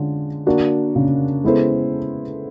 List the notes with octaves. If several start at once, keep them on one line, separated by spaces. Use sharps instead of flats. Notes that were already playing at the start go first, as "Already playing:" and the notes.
Already playing: D3 G#3 C#4 F4
A#3 D4 F#4
C#3
G#3 B3 E4 A4 C5